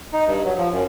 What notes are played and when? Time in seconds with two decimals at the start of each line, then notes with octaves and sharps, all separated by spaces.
0.13 D#4
0.27 G2
0.45 F#3
0.57 F3
0.72 F#2